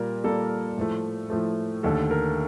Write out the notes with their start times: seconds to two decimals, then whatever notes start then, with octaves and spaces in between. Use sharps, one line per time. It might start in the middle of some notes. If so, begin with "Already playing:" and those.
Already playing: A#2 G3 A#3 A#4
0.24 A#2 G3 A#3 A4
0.78 A2 F3 A3
1.30 A2 F3 A3
1.83 D#2 D3 A3 A4
2.11 A#4